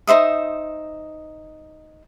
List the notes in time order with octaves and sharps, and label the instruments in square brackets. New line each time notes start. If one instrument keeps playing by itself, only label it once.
[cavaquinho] D#4 C5 E5 D#6